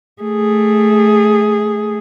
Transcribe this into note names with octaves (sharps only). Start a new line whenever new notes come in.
A3 G#4